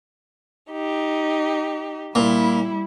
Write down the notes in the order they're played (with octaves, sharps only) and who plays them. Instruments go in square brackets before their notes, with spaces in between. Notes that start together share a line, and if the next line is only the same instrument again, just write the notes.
[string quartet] D#4 G4
[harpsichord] A#2 [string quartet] G3 E4